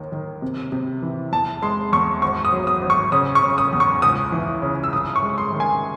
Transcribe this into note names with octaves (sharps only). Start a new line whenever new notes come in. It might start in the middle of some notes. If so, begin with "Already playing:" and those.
Already playing: D#2 D#3
D#3
C3
C3
E3
E2 A5
G#3 C6
E2 C#6
G#1 C#6
D#6
F#3
D#6
G#1
C#6
C#3 D#6
C#6
C#3
D#6
E2
C#6
C#2 D#6
E3
C#3
E6
C2 D#6
C#6
G#3
C6
D#3
G#5